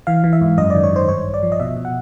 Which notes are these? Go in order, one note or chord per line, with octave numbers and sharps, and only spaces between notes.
E3 F5
E3
E5
G#2
F#2 D#5
D#3 D5
C#5
D#3 C5
G2 C#5
A1
D5
F3
D#5
B2 E5
B2
F#5